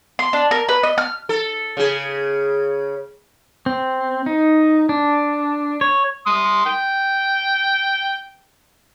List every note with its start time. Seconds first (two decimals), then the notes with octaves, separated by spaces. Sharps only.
0.19 C6
0.33 D4
0.51 A#4
0.69 B4
0.83 D#5
0.98 F6
1.29 A4
1.77 C#3 G#4
3.66 C4
4.26 D#4
4.89 D4
5.81 C#5
6.27 C6 D#6
6.66 G5